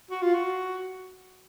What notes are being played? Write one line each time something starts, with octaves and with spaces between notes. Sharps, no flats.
F#4
F4
F#4